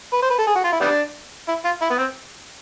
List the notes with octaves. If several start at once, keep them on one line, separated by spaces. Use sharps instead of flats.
B4
C5
B4
A4
G#4
F#4
F4
E4
G3 B3 D4
E4
F4
E4
B3
C4